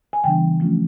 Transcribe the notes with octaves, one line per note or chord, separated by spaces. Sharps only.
G#5
C#3 E3 G3 B3 D4 G5
F3 A3 C#4 F4